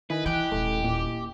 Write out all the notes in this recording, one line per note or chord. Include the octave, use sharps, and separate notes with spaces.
D#3 E4 B4 D#5 G#5
E3 G4 G5 F#6
D#1 A3
A#2 D6